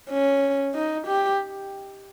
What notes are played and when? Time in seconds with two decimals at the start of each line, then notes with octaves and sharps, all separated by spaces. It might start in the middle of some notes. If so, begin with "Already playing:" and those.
0.10 C#4
0.74 D#4
1.07 G4